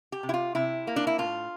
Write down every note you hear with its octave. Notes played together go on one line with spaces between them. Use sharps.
G4
C3
E4
F4
C3 E4
A#3
D4
E4
A2 F4